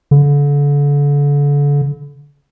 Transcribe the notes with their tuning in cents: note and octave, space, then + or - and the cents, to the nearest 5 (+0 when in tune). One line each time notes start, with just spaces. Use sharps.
D3 -35